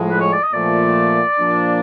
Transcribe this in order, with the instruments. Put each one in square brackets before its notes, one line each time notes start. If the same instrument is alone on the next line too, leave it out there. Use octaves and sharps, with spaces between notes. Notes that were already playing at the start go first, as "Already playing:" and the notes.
Already playing: [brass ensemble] A2 F3 G#3
[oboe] B4
C#5
D5
D#5
[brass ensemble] A#2 F3 A3 [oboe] D5
[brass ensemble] A#2 F3 A#3 D4